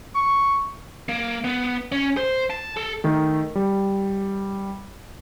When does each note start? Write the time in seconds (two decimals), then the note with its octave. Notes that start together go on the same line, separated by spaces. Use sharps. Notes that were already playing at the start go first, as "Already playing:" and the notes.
0.15 C#6
1.09 A#3
1.44 B3
1.92 C#4
2.17 C5
2.50 A5
2.77 A4
3.04 D#3 A3
3.55 G3